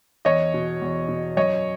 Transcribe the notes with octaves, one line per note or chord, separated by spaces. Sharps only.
E2 C#5 D#5
B2
E2
B2
F#2 C#5 D#5